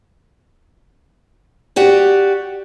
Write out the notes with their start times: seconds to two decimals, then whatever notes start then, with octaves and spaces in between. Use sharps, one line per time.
1.76 F#4 G4 D5